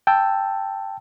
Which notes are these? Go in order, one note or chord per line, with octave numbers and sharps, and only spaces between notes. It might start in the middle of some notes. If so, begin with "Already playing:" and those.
G5 A5 E6